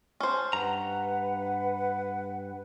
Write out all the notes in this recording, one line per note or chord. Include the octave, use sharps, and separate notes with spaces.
C#4 C5 A5
G2 B4 F#5 A#5